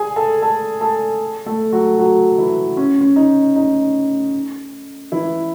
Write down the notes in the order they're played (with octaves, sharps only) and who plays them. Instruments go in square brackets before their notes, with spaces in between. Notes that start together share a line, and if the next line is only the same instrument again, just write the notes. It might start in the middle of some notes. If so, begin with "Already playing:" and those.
Already playing: [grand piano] G#4 G#5
A4 A5
A4 A5
A4 A5
A3 A4
F#3 F#4
F#3 F#4
E3 E4
C#4
C#4
D#4
D#4
E3 E4